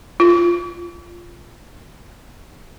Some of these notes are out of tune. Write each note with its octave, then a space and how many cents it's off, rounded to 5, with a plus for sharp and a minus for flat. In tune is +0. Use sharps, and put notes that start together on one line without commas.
F4 -10